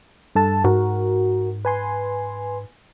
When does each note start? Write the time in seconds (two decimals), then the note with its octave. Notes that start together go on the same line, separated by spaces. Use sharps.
0.35 G2 A4 A5
0.64 G#2 F#4 A#4
1.65 B4 G#5 C6